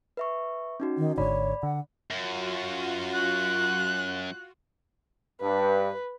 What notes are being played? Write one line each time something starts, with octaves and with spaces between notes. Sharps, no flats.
B4 E5 C#6
C#4 D#4 F#4
D#3
G#1 G#2 D3 C#5 D5 B5
D3 F#5
F#2 F4 F#4
F#6
G2 B4